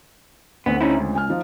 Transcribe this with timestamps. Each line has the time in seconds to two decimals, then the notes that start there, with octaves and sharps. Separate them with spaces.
0.66 D2 B3 C4
0.81 C#4 D#4 E4
0.98 C#2
1.15 G#5 F6
1.29 F3 D#4